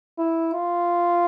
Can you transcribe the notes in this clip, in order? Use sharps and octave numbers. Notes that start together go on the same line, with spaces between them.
E4
F4